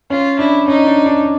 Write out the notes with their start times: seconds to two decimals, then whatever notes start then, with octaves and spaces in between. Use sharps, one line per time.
0.10 C#4 F4
0.39 D4 E4
0.68 C#4 D#4
0.87 D4
1.06 D4